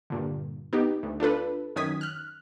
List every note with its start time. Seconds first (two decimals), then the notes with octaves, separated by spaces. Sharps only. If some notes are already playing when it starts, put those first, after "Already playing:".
0.10 G2 A#2 D3
0.73 B3 D#4 G4
1.03 D2
1.20 D4 F4 A4 B4
1.76 F#2 D#3 C#4 D#6 G#6 B6
2.01 F6 F#6